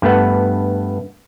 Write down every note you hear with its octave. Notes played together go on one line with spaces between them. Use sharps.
G2 A3 B3